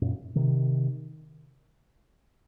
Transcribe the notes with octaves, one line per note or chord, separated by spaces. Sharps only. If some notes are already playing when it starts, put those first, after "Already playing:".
F#2 A#2
C3 D#3